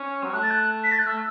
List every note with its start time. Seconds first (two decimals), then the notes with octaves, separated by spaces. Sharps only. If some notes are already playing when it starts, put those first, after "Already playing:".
Already playing: C#4
0.24 F#3
0.34 A3 F#6
0.43 A6
0.51 F#6
0.84 B6
0.92 A6
0.99 F#6
1.06 A3 E6